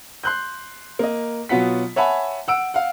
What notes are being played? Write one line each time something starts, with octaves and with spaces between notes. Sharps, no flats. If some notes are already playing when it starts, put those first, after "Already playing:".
C6 F#6 G6
A#3 D#5
B2 F#3 B3 F4 F#5 B6
C#5 E5 F#5 G#5 A5 B5
F#5 E6 D7
F5 F#5